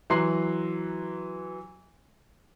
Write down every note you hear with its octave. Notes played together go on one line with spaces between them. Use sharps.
E3 F#3 A#5 C6 F#6 C7